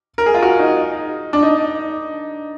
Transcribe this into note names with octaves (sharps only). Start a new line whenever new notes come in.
A#4
G#4
F4
F#4
D#4
D4
D#4